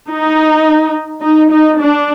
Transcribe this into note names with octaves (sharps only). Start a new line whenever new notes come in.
D#4
D#4
D#4
D4